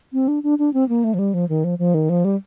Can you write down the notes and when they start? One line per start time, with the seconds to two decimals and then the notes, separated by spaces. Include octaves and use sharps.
0.13 C4
0.28 D4
0.43 D4
0.59 D4
0.74 C4
0.89 A#3
1.04 A3
1.14 F3
1.19 G3
1.34 F3
1.49 D#3
1.64 F3
1.79 F3
1.94 D#3
2.09 F3
2.25 G3